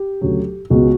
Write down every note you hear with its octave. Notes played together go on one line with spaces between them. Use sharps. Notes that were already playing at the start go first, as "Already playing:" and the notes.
Already playing: G4
D2 C#3 F#3
C#2 B2 G#3 B3 F#4